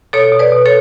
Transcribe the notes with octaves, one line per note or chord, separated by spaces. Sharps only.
B2 A4 C#5
B2
B4 D5
B2
A4 C#5